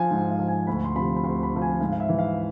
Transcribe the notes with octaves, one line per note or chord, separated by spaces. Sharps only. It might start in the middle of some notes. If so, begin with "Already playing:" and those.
Already playing: F3 G#5
G#2
F5
F3
G#5
D2 B5
C6
C3 F3 B5
B5
D2 C6
B5
C3 F3
G#5
G#2 F5
F5
E5
E3
F5